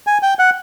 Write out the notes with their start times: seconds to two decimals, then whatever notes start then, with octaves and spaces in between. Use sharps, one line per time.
0.07 G#5
0.23 G5
0.39 F#5